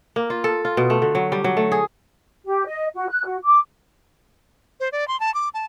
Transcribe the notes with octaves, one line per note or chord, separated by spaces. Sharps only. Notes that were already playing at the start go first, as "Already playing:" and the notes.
A#3
F4
A4
F4
B2
A3
D3
F#3
G3
F#3
A3
G#4
G4
D#5
F#4
F#6
F#4
D6
C5
D5
C6
A5
D6
A5